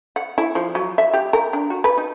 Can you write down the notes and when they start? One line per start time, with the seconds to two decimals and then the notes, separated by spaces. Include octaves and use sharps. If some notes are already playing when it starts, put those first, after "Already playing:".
0.16 F#5
0.38 E4
0.55 F3
0.75 F#3
0.98 E5
1.13 G4
1.33 A#4
1.53 D4
1.70 F#4
1.84 B4
1.97 D#4